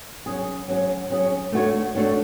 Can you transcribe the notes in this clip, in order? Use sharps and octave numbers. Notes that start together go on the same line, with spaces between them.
F#3 C#4 G#4
F#3 C#4 G#4
F#3 C#4 G#4
A3 D4 F#4 C#5
A3 D4 F#4 C#5